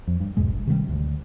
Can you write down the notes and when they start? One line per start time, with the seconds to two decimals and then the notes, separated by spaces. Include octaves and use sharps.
0.08 F2
0.20 G2
0.37 B1 E2 G#2 G#3
0.52 G1
0.67 C3 D#3 F3 G3
0.88 D2